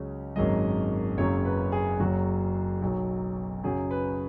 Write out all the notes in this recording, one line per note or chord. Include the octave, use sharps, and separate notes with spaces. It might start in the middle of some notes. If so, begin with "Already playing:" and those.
Already playing: C#2 C#3 F#3 C#4
G#1 F#2 D#3 G#3 D#5
F#1 F#2 C#3 F#3 C#5
B4
G#4
F#1 F#2 F#3 F#4
B1 B2 F#3
F#2 C#3 F#3 G#4
B4